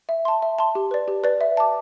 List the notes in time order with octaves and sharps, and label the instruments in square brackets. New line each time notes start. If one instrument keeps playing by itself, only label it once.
[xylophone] E5
A5 C6
E5
A5 C6
G4
B4 D5
G4
B4 D5
E5
A5 D6